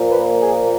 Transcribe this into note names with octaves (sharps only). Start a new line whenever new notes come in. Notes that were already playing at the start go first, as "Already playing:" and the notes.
Already playing: A#2 F3 A#3
B4
G#4